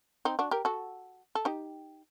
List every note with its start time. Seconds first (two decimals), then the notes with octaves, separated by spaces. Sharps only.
0.25 C4 D#4
0.39 D4 F#4
0.51 G4 A#4
0.65 F#4 A4
1.35 A4
1.45 D#4 G4